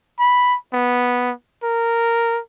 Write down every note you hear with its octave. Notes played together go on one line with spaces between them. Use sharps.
B5
B3
A#4